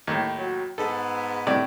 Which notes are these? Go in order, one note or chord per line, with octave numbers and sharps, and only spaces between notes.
D#2 A2
F#3
G#2 B3 A4
A2 C3 D5